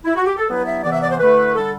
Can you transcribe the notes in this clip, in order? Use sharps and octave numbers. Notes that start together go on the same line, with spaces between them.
E4
F#4
G4
A4
G2 F#3 B3 E4 B4
E5
C3 E3 B3 D5
E5
D5
C5
D3 A3 E4 B4
D3 G3 D4 A4